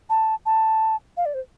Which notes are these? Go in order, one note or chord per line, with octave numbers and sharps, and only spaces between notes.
A5
A5
F5
D5
C5